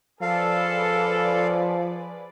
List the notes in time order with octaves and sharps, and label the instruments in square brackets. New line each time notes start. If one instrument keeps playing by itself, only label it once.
[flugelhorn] F3 [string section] G#4 B4 D5 [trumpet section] A4 [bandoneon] F5